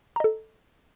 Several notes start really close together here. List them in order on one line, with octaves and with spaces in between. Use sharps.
A#5 D#5 A4